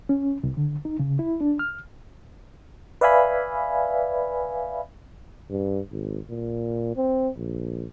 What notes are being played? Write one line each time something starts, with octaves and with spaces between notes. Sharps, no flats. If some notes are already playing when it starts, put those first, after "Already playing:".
C#4
C2
D3
D#4
C#3
E4
D4
F6
B4 D5 E5 F5 G#5 B5
G2
G#1
A#2
C4
A#1